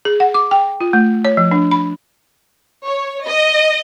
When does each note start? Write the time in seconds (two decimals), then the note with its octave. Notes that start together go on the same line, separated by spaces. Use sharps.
0.05 G#4
0.20 F#5
0.34 D6
0.51 G5
0.81 F4
0.93 A3
1.25 C#5
1.37 F3
1.51 D4
1.71 B5
2.85 C#5
3.25 D#5